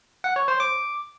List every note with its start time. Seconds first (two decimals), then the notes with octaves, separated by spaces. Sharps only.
0.24 F#5
0.36 C#5
0.48 C5
0.60 D6